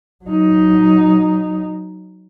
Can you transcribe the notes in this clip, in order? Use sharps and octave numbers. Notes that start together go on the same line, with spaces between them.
F#3 D#4